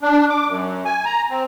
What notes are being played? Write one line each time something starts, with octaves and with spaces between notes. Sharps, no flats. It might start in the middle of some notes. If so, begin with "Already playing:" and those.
D4
D6
F#2
G#5
A#5
C4